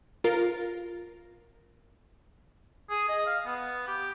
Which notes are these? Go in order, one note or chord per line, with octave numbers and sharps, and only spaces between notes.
F4 A#4
G#4
D#5
F5
B3
G4